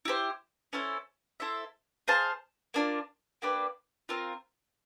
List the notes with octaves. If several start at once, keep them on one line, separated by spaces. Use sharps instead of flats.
E4 G4 C5
C#4 E4 A4 C5
E4 A4 C5 E5
G#4 C5 F5 A5
A#3 D4 F4
A#3 D4 G4 B4
C4 F4 A#4